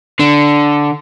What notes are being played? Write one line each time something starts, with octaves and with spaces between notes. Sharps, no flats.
D3